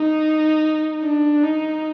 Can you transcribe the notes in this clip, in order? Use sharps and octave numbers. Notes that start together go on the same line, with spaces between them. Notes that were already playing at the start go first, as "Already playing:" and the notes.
Already playing: D#4
D4
D#4